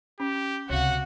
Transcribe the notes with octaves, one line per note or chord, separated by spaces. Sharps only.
C#4 G4
C#2 C3 F#4 C#5 F5 F#5